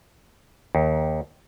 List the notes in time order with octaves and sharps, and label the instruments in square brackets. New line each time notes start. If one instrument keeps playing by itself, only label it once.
[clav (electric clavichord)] D#2